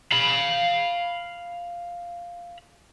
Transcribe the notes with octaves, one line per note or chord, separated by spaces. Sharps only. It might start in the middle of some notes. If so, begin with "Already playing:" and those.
F5 B5